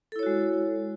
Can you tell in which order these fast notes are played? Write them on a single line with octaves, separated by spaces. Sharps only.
A4 E4 C#5 F#4 G#3